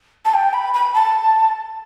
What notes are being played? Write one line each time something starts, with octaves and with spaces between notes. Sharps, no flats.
A5
G5
B5
B5
A5